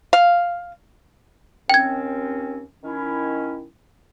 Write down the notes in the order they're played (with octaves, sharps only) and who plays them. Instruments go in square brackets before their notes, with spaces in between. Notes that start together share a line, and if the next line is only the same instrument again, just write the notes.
[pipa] F5
[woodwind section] D#2 C4 C#4 [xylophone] G5 G#6
[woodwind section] D#3 C#4 E4